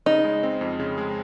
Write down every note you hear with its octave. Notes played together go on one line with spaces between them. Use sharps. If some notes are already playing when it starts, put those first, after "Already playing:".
C#3 D#4
G#3
C4
F2
C#3
G#3